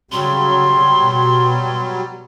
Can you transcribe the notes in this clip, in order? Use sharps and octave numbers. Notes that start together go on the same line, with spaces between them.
C#3 F#3 G3 C6
B2